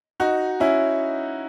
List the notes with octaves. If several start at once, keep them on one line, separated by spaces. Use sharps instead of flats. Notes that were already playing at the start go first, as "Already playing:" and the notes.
D#4 F#4
C#4 E4